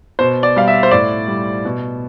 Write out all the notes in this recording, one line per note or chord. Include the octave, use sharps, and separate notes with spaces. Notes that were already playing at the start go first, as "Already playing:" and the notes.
B2 C5
D5
G3 F5
E5
C5
A2 D5
G3
B2